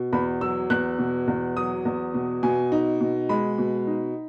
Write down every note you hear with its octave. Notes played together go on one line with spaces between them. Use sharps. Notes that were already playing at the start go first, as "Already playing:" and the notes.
Already playing: B2
E2 B5
F#3 E6
E2 F#6
B2
E2
F#3 D#6
E2
B2
B2 G#5
D#4
B2
G#3 B5
B2
D#4